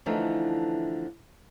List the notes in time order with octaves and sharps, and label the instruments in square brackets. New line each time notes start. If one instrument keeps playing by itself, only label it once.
[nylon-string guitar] D3 E3 F3 A3 D4 D#4